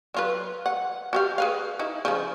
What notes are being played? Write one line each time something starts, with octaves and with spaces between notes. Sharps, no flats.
F#3 F4 B4
F#5
F#4 G4 F5
G#4 B4 F5
D#4 E4
C#3 F3